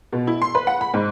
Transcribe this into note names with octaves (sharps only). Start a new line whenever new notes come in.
B2
E4
C6
B4
F#5
B5
G#2